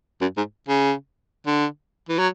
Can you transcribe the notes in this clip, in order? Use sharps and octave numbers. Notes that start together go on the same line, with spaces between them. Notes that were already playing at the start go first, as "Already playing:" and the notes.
F#2
G#2
C#3
D3
E3
F#3